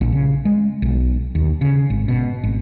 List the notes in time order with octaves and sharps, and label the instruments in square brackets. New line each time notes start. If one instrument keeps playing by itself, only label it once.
[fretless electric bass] A#1
C#3
G#3
B1
D#2
C#3
G#1
B2
G#1